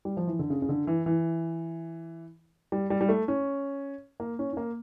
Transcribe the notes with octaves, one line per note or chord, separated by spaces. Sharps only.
G3
F3
E3
D3
C#3
C#3
D3
E3
E3
G3
G3
G3
A3
C#4
A#3
C#4
C#4
A#3